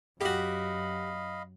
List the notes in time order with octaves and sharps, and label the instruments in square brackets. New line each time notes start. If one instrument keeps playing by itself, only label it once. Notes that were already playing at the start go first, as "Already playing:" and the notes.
[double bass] F#2 [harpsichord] F#4 G4 [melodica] D#5 F5 B5